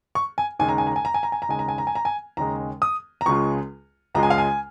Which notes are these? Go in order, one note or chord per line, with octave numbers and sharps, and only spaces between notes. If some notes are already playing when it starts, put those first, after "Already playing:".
C#6
G#5
D#2 C#3 G#3 G#5
A#5
G#5
A#5
G#5
A#5
G#5
A#5
G#5
A#5
D#2 C#3 G#3 G#5
A#5
G#5
A#5
G#5
A#5
G#5
D#2 C#3 G#3 A#5
D#6
A#5
C#2 C#3 G#3 F4 C#6
C#2 C#3 G#3 F4 A#5
G#5
F5
G#5